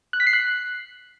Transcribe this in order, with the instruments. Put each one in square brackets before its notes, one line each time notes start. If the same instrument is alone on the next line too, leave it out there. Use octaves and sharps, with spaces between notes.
[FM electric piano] F#6
B6
C7
F#6